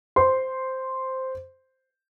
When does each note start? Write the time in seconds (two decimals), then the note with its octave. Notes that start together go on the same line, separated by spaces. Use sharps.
0.16 C5 C6